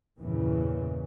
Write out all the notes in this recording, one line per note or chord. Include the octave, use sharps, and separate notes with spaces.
E2 G2 A#2 C#3 E3